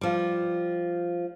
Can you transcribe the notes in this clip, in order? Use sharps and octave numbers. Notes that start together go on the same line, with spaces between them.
F3 G3